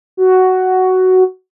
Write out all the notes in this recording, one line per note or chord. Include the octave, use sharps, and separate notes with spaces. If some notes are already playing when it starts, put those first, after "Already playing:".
F#4